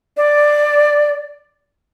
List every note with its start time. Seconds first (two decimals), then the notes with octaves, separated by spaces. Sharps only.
0.17 D5